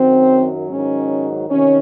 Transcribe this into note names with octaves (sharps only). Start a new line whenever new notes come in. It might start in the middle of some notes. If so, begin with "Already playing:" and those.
Already playing: F#2 D#3 F#3 C4
G#2 D#3 F#3 C#4
C3 D#3 C#4